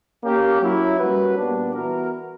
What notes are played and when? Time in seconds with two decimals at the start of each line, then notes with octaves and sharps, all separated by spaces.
0.23 A#3 C#4 G4
0.61 F#3 C#4 E4
0.99 G3 A#3 C#4 F#4 B4
1.37 A#2 G3 B3 D4
1.75 E3 B3 F#4 A#4